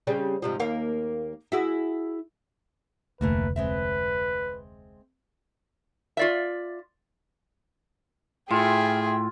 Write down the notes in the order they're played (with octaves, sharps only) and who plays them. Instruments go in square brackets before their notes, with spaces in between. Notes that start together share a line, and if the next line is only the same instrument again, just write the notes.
[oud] C#3 G3 C4
G#2 C3 F3
D#2 A#3 F5
E4 F#4 G#4
[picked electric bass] F1 D2 [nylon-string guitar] E3 A3 A#3 [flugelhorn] B4
[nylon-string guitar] G#3 C4 E5 [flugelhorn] B4
[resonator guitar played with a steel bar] F4 D5 E5
[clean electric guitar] A2 [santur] F4 [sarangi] G#4 [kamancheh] E5 G5